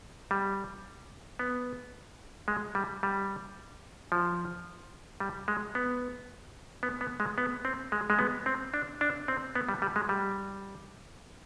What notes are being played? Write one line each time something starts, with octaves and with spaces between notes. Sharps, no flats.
G3
B3
G#3
G3
G3
F3
G3
G#3
B3
B3
B3
G#3
B3
C4
G#3
G#3
B3
C4
D4
D4
C4
B3
G3
G3
G#3
G3